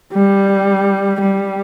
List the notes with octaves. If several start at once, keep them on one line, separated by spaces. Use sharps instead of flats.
G3
G3